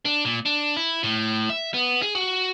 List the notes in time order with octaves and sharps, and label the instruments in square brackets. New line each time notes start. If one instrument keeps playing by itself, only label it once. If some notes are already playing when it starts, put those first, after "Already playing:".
[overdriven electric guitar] D4
A#2
D4
E4
A2
E5
B3
G#4
F#4